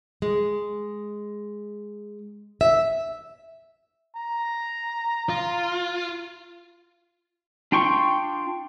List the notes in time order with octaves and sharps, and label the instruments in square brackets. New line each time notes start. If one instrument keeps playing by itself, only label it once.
[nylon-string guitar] G#3
E5
[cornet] A#5
[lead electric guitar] F4
[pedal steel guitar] D4 F4 G5 C6 C#6